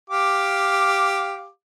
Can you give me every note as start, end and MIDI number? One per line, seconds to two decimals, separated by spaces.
0.10 1.48 67
0.10 1.48 77
0.10 1.48 86